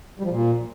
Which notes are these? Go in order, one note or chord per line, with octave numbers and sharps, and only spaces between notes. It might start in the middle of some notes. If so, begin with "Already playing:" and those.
G3
F3
A#2